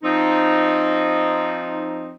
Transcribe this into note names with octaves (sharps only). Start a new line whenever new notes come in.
F3 C4 D#4